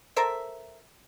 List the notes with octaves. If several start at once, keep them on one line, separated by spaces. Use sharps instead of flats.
A4 A#4 C5 E5